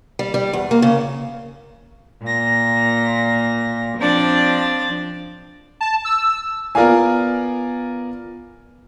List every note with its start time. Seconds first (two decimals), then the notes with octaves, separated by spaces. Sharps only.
0.19 G3
0.34 G3
0.53 E2
0.71 A#3
0.82 C#3
2.22 A#2 A#6
3.97 F3 C4 D4 D5
5.81 A5
6.05 E6
6.75 B3 F4 A#4 D5 F5 G#5